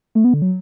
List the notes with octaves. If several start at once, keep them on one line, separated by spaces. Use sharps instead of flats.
A3
B3
D3
F#3